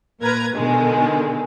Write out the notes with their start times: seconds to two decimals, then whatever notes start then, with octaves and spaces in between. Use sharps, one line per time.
0.21 A#2 A#4 B4 A#5 G#6
0.54 B2 D3 D#3 G#3